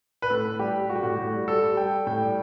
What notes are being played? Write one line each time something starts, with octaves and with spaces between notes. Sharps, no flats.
B4
A2 A4
A2
G3 G4
G3
G3 F#4
G4
A2 F#4
A2
G3
G3 A4
G3
G3 G5
G3
A2 G5
G3